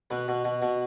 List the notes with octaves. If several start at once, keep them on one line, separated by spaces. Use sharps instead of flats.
B2 B4
B2
B2
B2